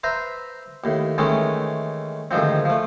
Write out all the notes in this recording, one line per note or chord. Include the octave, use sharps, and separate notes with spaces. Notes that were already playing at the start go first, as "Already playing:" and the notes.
B4 C5 E5 A#5
D#2 A2
D#3 E3 G#3 A3 C#4
D2 G#2 D#3 F3 C4
F3 A3